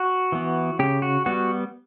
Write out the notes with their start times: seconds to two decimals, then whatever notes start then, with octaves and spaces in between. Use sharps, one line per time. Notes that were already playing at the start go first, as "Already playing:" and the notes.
Already playing: F#4
0.32 E3 B3
0.79 C#3 G4
1.02 F#4
1.26 G3 B3 F#4